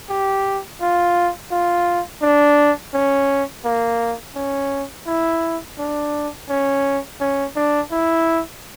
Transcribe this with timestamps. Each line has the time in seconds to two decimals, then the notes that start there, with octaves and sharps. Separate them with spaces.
0.09 G4
0.81 F4
1.51 F4
2.22 D4
2.94 C#4
3.65 A#3
4.35 C#4
5.07 E4
5.78 D4
6.49 C#4
7.21 C#4
7.56 D4
7.91 E4